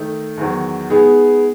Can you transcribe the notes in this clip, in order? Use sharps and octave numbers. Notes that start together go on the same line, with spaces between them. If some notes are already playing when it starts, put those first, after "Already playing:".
Already playing: D#3 A3 D#4
E2 D#3 F#3
G#3 B3 D#4 G#4